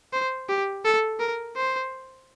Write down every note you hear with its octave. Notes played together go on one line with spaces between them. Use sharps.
C5
G4
A4
A#4
C5